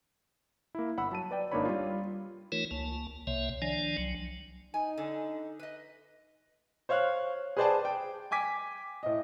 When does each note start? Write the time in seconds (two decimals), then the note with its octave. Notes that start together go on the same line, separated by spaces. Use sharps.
0.75 A#3 E4
0.97 G1 F#5 B5 E6
1.11 F#3 A5 D#7
1.31 B4 D5 G5
1.52 G#1 A#3 D4 D#4 C#5 B5
1.65 G3 F4
2.52 E3 A3 D#4 F4 A#4 C#5
2.71 C#2 A#3 A5
3.27 C2 C3 A#3 C#5 E5
3.62 D#3 F3 D4 D5 G#5
3.97 C2 F#3
4.74 D#4 G#5
4.98 D3
5.59 B4 D#5
6.89 C5 C#5 F5 F6 F#6
7.57 G#4 B4 C5 D5 G5 A5
7.85 G5
8.31 G5 G#5 D6 B6
9.03 A2 D#5